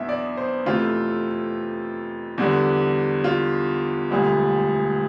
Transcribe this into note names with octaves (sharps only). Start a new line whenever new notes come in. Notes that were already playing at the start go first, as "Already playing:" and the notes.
Already playing: E2 B2 B3 D4 E5
D5
C5
F2 C3 E3 A3 F4
E2 D3 G3 D4
F4
E1 D2 D3 G3